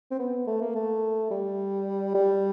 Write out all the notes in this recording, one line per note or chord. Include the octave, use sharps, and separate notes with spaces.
C4
B3
A3
A#3
A3
G3
G3